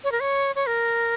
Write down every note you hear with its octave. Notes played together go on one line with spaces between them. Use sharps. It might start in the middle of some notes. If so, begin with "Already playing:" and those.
C#5
A#4
C#5
C#5
A#4